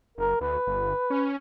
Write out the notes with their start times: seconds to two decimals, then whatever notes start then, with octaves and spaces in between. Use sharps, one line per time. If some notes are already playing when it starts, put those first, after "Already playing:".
0.18 F#1 A#4
0.41 D2 B4
0.67 G1
1.10 C#4